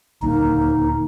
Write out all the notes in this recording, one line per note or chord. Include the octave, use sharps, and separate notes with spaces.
D#1 D2 A#3 D#4